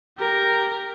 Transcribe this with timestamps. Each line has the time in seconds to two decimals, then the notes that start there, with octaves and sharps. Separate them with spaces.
0.18 G4 A#4